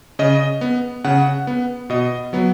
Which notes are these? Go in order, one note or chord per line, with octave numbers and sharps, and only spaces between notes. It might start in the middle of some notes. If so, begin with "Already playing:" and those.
C#3 D#5
B3
C#3 F#5
B3
B2 D#5
F#3 B3